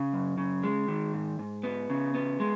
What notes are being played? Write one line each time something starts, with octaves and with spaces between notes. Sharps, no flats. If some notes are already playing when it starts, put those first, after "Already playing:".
Already playing: C#3
F#2
C#3
G#3
D#3
G#2
G#2
B3
C#3
B3
G#3